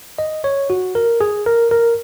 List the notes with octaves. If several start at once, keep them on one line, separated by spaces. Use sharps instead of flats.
D#5
C#5
F#4
A#4
G#4
A#4
A#4